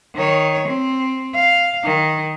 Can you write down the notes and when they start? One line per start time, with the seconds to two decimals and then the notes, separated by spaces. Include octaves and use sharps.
0.15 D#3 C#5
0.68 C4
1.35 F5
1.84 D#3